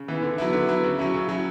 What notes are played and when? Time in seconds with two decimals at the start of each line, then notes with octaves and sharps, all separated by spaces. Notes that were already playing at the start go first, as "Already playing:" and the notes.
Already playing: C#3
0.08 E3 B3
0.23 D3
0.38 F#3 B3 E4
0.53 D3
0.68 F#3 B3 E4
0.84 C#3
0.99 F#3 C#4 E4
1.14 C#3
1.29 F#3 C#4 E4